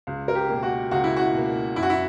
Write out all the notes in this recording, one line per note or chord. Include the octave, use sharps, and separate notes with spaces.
C#2
A#4
G4
B2 A#3
F#4
C#2 F#4
E4
F#4
B2 A#3
F#2 E4
F#4
E4